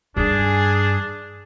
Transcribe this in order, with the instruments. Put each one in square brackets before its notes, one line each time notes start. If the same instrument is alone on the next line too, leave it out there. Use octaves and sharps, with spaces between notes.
[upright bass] G2 D#3 [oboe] D4 [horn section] G#4